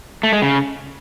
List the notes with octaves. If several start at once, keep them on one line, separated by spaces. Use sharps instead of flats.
A3
G#3
C#3